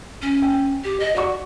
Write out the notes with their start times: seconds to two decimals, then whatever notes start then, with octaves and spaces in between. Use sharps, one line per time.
0.22 C#4
0.42 G5
0.84 G4
1.00 D#5
1.16 F#4 D5 F#5 C#6